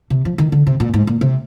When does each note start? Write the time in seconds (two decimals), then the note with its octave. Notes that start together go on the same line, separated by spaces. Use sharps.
0.10 C3
0.25 F3
0.38 D#3
0.52 D3
0.67 C3
0.80 A#2
0.94 G#2
1.07 A#2
1.21 C3